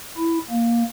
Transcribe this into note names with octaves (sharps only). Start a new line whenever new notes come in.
E4
A#3